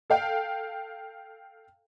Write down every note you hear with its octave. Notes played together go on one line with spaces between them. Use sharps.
A4 F5 G5